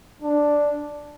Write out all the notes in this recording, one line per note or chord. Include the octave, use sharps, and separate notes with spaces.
D4